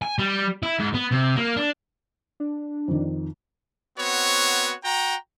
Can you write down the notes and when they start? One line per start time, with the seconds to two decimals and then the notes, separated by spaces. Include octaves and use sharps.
0.02 G#5
0.19 G3
0.63 E4
0.79 G#2
0.95 B3
1.12 C3
1.37 A#3
1.57 D4
2.40 D4
2.88 F2 D#3
3.99 B3 C4 F#4 C#5
4.85 F#4 G5 A#5